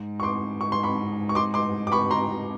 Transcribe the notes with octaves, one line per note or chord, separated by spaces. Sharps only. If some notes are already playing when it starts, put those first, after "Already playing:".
Already playing: G#2
C#6
C6 D6
C#6
C6
B5 C#6
C#6
C6 D6
C6 D6
D6
B5 C#6
A#5 C6